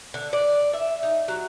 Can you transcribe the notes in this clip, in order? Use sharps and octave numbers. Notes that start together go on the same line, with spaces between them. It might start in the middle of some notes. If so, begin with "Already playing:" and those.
D3
D5
E5
D#4
F#3